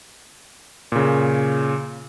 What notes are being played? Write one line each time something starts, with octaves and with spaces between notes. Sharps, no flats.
A#2 C#3